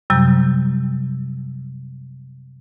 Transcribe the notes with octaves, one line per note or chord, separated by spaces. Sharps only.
F#2 C3 F#3 G3 G6